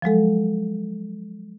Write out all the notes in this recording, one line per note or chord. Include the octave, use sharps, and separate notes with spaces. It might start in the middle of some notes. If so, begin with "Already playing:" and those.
F3 F#3 G#3 A4